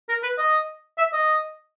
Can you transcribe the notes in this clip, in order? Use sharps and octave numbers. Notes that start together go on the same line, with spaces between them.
A#4
B4
D#5
E5
D#5